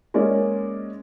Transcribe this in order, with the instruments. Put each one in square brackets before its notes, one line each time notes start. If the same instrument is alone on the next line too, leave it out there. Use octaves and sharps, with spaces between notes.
[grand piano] G#3 A#3 C#4 A#4 D5